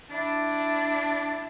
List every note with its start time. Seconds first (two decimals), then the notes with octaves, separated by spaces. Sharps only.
0.11 D4 E4 A5